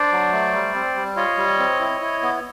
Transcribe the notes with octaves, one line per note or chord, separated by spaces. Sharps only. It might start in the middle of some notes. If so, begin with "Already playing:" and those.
Already playing: D4 C5 D5
F#3
A3
G3
C4
G3
F4 C#5 D#5
G3
C4
E4
E4
B3